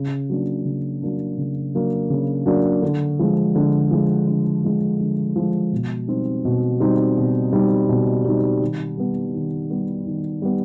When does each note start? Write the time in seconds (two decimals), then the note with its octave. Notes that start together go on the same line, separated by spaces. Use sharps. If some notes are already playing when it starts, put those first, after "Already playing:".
Already playing: C#3
0.30 F#3 A#3 D4
0.65 C#3
1.02 F#3 A#3 D4
1.38 C#3
1.75 F#3 A#3 D4
2.10 C#3
2.46 F#3 A#3 D4
2.82 D3
3.19 F3 G#3
3.55 D3
3.91 F3 G#3
4.28 D3
4.64 F3 G#3
5.00 D3
5.36 F3 G#3
5.73 B2
6.08 G3 C4 D#4
6.45 B2
6.80 G3 C4 D#4
7.17 B2
7.53 G3 C4 D#4
7.89 B2
8.25 G3 C4 D#4
8.61 D#3
8.97 G3 B3
9.34 D#3
9.70 G3 B3
10.07 D#3
10.42 G3 B3